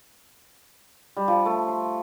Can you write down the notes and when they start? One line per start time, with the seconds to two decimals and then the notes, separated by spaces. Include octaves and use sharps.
1.17 G3
1.28 F3
1.45 A3
1.68 C6